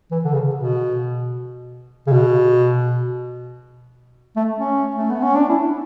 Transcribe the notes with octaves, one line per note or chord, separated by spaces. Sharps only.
E3
D3
C#3
B2
C#3
B2
A3
C#4
A3
B3
C#4
D4
E4